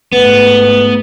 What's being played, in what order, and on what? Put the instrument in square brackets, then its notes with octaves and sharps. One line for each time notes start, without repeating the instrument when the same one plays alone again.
[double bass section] G#2 A3 [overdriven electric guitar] B3 [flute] B4